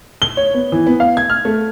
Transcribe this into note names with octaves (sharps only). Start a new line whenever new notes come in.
G7
C#5
B3
E3
B3
F5
G#6
F6
A3